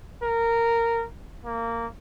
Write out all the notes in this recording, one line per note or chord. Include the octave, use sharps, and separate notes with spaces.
A#4
A#3